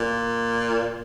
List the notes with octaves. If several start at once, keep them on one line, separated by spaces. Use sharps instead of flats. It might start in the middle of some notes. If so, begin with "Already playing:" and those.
Already playing: A#2